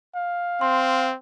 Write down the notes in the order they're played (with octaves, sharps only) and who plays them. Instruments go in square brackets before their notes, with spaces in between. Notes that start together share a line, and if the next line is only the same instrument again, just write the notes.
[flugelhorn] F5
[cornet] C4 [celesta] C6